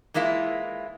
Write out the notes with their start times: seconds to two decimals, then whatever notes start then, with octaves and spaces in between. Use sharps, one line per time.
0.14 E3 G#3 A#3 E4 F4